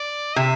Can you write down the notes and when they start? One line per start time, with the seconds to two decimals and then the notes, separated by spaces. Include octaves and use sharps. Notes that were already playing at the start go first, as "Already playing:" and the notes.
Already playing: D5
0.36 C3 E5